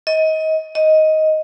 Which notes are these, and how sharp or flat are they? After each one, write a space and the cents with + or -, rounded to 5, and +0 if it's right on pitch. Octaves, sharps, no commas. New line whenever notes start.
D#5 +25
D#5 +10